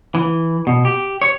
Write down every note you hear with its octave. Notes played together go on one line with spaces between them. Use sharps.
E3
B2
G4
C#5